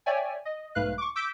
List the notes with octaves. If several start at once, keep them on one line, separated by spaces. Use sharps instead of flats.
C#5 D5 E5 G5 G#5
D#5
B1 G#2 A3 B4 F5 F#6
C#6 D6
D6 E6 G6 B6 D7